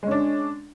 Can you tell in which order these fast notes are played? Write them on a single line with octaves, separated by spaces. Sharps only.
G#3 C#4 D4